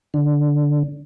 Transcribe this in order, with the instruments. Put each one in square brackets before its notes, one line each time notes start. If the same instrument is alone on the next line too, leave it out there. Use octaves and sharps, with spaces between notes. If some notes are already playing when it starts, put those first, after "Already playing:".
[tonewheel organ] D3